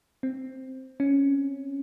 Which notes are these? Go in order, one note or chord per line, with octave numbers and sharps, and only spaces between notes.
C4
C#4